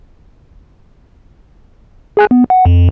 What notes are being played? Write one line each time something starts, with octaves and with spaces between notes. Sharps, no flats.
G#4 G#5 F#6
B3
F#5
F2